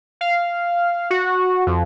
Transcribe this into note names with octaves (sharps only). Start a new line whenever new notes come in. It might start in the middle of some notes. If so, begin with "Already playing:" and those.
F5
F#4
F2